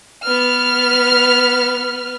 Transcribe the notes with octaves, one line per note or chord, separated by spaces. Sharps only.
B3 F6